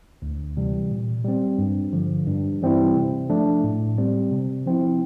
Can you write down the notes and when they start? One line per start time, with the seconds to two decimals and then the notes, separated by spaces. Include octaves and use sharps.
0.22 D2
0.57 C3 E3 G3
0.90 A#2
1.24 G3 C4
1.58 G2
1.93 D3 F3
2.27 G2
2.62 E3 G3 C4 E4
2.95 C3
3.30 F3 A3 D4
3.64 A2
3.98 G3 C4
4.31 C3
4.66 F3 C4 E4